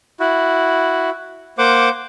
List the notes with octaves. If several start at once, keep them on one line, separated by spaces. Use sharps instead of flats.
E4 F#4
A#3 C5 F#5 D6